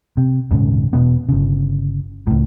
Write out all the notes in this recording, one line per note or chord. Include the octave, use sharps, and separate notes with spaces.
C3
D#1 G#2 C#3
E1 B2 B3
G1 C#3
C#2 A2